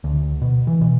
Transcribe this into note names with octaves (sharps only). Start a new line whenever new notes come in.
D2
B2
E3
B2